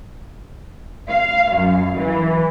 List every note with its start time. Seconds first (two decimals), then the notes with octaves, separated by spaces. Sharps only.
1.10 F5
1.56 F#2
1.97 E3